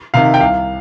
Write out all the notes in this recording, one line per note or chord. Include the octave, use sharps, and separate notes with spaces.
C3 D#3 F5
G5
C2 F5